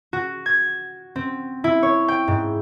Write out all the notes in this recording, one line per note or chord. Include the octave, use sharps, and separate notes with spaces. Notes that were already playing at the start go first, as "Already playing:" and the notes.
F#4
G#6
C4
E4
C#5
G5
G#2